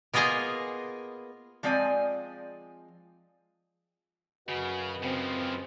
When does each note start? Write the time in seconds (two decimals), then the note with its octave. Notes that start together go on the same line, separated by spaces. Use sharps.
0.14 A#3 B3 F4 G#4 D#5 F5
1.63 F3 G#3 C4 D5 D#5 G#5
4.48 F#2 C#3 F#4 B4 D#5
5.03 C#3 F3 C4